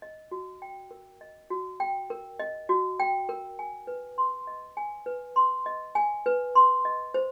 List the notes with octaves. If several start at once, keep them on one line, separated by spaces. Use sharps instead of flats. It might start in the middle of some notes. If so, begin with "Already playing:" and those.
D#5
F#4
G5
A#4
D#5
F#4
G5
A#4
D#5
F#4
G5
A#4
G#5
B4
C6
D#5
G#5
B4
C6
D#5
G#5
B4
C6
D#5
C5